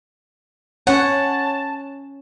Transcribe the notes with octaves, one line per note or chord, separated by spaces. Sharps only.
C#4 C#5 F#5 A5